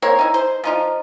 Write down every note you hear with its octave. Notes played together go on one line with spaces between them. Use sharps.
A#3 C4 C#5
D#4 E4
C5
F3 D#4 F4